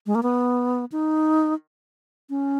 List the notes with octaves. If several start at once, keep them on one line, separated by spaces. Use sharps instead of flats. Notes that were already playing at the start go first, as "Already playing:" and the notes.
G#3
A#3
B3
D#4
C#4